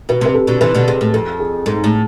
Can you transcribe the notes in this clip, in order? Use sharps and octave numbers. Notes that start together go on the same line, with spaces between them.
B2 B4
C3 B4
A4
B2 D3
C3 E3 B4
B2 D3
C3 G#4
A2
F2 A4
G#4
G#2 A4
A2